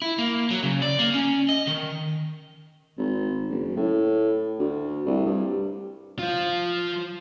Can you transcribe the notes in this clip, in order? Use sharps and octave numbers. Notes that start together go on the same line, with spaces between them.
E4
A#3
F#3
C#3
D5
A#3
C#4
D#5
D#3
G#1
F#1
A2
D2
C2
G2
F3 F4